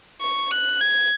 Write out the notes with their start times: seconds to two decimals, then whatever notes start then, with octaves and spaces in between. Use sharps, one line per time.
0.22 C#6
0.51 F#6
0.81 G#6